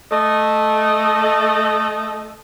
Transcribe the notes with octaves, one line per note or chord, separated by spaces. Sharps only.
A3 D#5